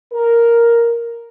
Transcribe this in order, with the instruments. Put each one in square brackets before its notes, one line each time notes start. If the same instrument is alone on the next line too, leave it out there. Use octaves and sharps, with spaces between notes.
[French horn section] A#4